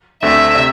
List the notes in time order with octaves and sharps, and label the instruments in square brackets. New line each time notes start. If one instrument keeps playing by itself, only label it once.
[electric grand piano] D2 D3 A3 C4 [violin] E5
[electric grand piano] C3